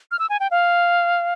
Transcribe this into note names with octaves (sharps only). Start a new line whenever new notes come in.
F6
E6
G#5
G5
F5